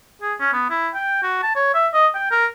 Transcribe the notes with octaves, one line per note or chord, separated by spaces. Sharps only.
G#4
C#4
B3
E4
G5
F#4
A5
C#5
E5
D#5
G5
A#4